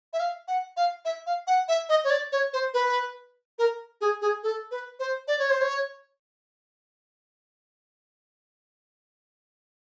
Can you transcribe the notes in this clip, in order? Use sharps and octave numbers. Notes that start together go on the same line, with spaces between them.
E5
F5
F#5
F5
E5
F5
F#5
E5
D#5
C#5
D5
C#5
C5
B4
A#4
G#4
G#4
A4
B4
C5
D5
C#5
C5
C#5